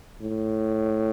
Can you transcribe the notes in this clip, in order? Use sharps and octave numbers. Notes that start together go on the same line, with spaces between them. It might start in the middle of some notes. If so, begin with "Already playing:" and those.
A2